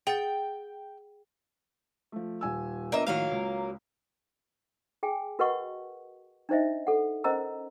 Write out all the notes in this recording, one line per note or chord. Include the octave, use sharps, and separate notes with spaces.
G#4 F#5 G5 A6
F3 A3
D#1 G#5 E6
A#3 B3 D4 F4 D#5 E5
A2 D#3 F3 F#3 A#3 F5
C#2
G#4 G5 G#5
F#4 A#4 B4 D#5 F#5 C#6
D4 D#4 C5 D#5 E5
A4 F#5
C#4 A#4 C5 D#5 A#5 E6